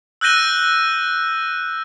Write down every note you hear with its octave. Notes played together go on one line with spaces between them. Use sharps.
E6 F#6 G6 A#6 D#7 G7